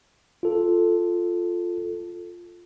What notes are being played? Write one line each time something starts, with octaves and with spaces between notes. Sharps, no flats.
F4 A4